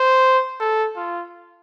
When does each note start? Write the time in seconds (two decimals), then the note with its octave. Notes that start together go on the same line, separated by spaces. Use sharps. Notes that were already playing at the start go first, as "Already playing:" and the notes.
Already playing: C5
0.60 A4
0.96 F4